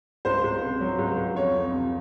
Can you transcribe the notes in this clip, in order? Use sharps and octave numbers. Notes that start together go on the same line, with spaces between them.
C#2 C5
C#2
C3
F#3
C#2
C#2
F2 C#5
F2
C3